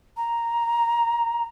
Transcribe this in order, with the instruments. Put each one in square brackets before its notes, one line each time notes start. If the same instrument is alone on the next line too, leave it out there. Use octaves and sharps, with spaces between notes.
[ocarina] A#5